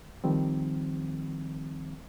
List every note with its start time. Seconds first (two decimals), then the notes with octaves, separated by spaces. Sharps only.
0.24 D#3 F3 G3 C4